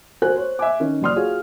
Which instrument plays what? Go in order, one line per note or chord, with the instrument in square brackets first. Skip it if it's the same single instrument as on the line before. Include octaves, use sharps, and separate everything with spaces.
[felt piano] F#4 A#4 C5 G#5 F#6
C5 C#5
E5 G#5 D6
D#3 C#4
F#1 F#3 D5 C6 D#6 F6
F4 F#4 G#4 C#5 F5